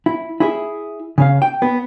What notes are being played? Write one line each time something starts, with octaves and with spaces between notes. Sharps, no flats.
E4
E4 G#4 E5
C#3 C#4 F5
G5
B3